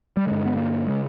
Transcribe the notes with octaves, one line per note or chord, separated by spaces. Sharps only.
G3
G2 D3 G#3
B3
A#3
C#3 G#3